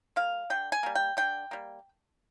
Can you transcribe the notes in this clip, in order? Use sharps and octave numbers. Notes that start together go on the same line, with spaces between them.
G3 A#3 F5
D3 G5
G#5
G3 A#3
G5
D3 G5
G3 A#3